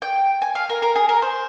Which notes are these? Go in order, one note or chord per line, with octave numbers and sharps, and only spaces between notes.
G5
G#5
F5
A#4
A#4
G#4
A#4
C5